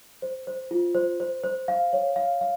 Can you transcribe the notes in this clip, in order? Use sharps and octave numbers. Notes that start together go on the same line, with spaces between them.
C5
C5
F4
C5
C5
C5
F5
C#5
F5
F5